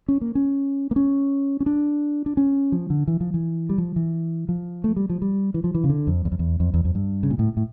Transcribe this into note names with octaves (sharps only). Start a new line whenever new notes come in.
C#4
A#3
C#4
A#3
C#4
C#4
D4
D4
C#4
F3
D3
E3
F3
E3
G3
F3
E3
F3
A3
G3
F3
G3
E3
F3
E3
C#3
D3
F2
E2
F2
E2
F2
E2
F2
G2
C#3
A#2
A2
A2